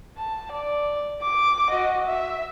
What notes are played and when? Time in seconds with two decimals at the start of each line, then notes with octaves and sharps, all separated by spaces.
0.17 A5
0.52 D5
1.22 D6
1.70 F#4 D#5
2.06 E5